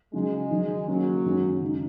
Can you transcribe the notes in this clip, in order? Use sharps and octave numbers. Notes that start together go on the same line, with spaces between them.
C#3 F#3 G#3 D#4
D#3 F#3 D#4
C#3 F#3 A#3 C#4
F#2 D#3 G#3 D#4
C#3 G#3 D#4